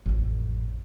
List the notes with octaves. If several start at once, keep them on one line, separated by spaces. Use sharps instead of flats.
A1 F2